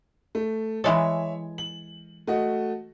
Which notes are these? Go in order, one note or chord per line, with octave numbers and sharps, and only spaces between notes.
A3
E3 G#3 A4 C#5 E5
F#7
A3 F#4 D#5